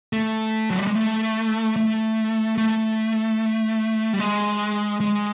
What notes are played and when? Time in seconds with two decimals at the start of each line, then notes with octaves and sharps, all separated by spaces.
0.13 A3
0.70 F#3
0.79 G3
0.87 G#3
0.95 A3
1.76 A3
2.58 A3
4.13 G3
4.19 G#3
5.00 G#3